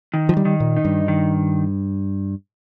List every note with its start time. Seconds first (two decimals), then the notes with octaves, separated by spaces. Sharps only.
0.14 D#3
0.29 F3
0.37 G3
0.45 D#3
0.60 A#2
0.77 D#4
0.85 G2
1.08 D#3